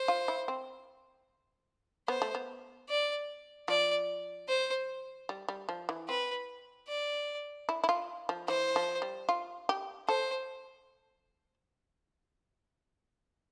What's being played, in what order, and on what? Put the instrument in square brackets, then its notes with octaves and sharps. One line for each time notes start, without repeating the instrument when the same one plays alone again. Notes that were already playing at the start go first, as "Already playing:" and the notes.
Already playing: [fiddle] C5
[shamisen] F4
E4
C4
[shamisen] B3 [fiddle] C5
[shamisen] A3
B3
[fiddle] D5
[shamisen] F3 [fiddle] D5
[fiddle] C5
[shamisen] G3
G3
F3
E3
[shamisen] C4 [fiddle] B4
[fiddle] D5
[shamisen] E4
E4
F4
F3
[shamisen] E3 [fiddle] C5
[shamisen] F3
G3
F4
G4
[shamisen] A4 [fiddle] C5